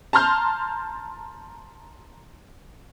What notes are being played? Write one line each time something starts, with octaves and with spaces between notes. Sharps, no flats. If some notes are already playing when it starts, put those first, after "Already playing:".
A5 A#5 C6 F6 G6